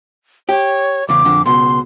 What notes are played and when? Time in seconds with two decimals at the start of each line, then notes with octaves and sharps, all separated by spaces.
0.49 G4 C#5
1.09 E2 C#3 D6
1.25 F2 D3
1.46 C#2 B2 C6